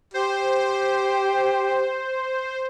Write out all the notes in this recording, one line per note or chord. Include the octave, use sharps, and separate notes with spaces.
G4 C5